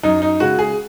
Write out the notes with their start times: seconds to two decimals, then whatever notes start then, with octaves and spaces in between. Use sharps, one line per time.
0.03 F#2 D#4
0.22 D#4
0.40 C#3 G#3 F#4
0.59 G#4